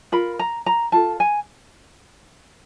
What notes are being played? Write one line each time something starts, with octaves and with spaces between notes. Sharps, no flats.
F4 A#4 B5
A#5
A#5
F4 A4 A5
G#5